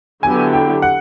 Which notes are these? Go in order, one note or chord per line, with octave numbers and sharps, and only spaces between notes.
D3 F#3 B3 E4 G4 G#5
G5
F#5